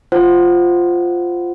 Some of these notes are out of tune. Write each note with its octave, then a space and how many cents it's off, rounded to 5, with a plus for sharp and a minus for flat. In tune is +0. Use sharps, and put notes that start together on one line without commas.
F4 +0 C5 +0 F#5 +0